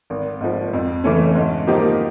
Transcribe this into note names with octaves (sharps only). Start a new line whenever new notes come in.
G#1
G#2 F3
F2
C#3 E3 A3 C#4
G#2
F3 A#3 D#4 G4